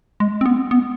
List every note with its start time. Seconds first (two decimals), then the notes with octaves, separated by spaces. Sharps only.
0.20 G#3
0.41 C4
0.46 B3
0.71 B3